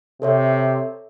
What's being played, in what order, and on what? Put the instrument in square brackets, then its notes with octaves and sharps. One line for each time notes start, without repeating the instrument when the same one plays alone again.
[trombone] C3 [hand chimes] A4 C#5 E5